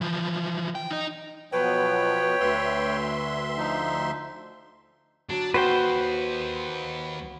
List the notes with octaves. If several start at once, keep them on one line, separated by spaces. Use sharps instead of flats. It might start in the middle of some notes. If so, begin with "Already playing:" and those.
E3 F3
G5
D#4 D#5
B2 F3 F#3 B4 C#5 G5
D2 E5 C6
F3 D#4
F#3 D4
D#2 F#4 B4 C5 G5